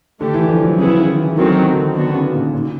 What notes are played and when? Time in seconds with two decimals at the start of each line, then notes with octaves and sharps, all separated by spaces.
0.20 D3 A3 D4 G4
0.34 E3
0.49 F3
0.63 F#3
0.78 C#3 B3 E4 G#4
0.97 D#3
1.18 E3
1.37 D#3 E3 F#3 A3 C4
1.70 D3
1.76 D#3
1.95 D3 B3 D4 F#4
2.14 C#3
2.33 A#2
2.53 A#2